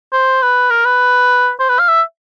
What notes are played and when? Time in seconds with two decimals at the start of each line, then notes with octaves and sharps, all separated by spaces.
0.13 C5
0.42 B4
0.70 A#4
0.85 B4
1.60 C5
1.69 B4
1.79 F5
1.88 E5